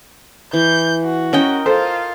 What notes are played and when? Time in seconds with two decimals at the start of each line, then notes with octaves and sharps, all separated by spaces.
0.53 E3 G6
1.04 F#4
1.33 C#4 A#4 D#5 G5
1.66 F4 A4 C5